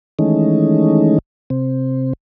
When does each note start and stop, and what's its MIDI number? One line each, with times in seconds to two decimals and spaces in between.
0.19 1.19 51
0.19 1.19 52
0.19 1.19 56
0.19 1.19 57
0.19 1.19 61
0.19 1.19 63
1.50 2.13 48
1.50 2.13 60